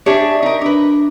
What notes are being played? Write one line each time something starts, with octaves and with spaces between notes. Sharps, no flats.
D4 G4 G#4 C#5 D5 E5
D#4 A#4
D4 A#4 B4